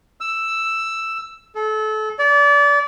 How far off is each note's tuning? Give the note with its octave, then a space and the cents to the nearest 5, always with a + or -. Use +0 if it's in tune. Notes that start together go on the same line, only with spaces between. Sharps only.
E6 +5
A4 -30
D5 -30